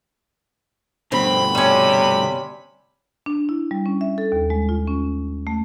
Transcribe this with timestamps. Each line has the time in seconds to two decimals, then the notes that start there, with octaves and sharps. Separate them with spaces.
1.12 G2 B2 D3 C4 B5
1.55 C3 G3 C#4
3.26 D4
3.49 E4
3.71 G3
3.86 C#4
4.01 E5
4.18 A4
4.32 D#2
4.50 G#3
4.69 F4
4.87 C#4
5.47 A3